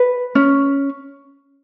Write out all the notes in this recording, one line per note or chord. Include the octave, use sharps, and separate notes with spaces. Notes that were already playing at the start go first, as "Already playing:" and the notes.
Already playing: B4
C#4